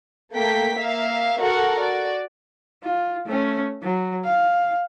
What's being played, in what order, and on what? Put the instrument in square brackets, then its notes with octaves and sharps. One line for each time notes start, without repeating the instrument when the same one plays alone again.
[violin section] A3 A#3 G5 B6
A#3 E5 F5
F#4 A4 A#4 F#5
F#4 D5
[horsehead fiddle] F4
A3 C#4
F#3
F5